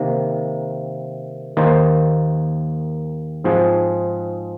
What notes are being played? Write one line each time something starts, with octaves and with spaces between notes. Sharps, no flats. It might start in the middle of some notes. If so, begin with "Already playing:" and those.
Already playing: C3 D#3 A#3
D#2 D#3 A#3 D#4 C5
G#2 F3 C4 G#4